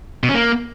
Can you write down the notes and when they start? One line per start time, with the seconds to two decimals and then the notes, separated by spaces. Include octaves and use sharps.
0.23 B2
0.29 C#4
0.34 A#3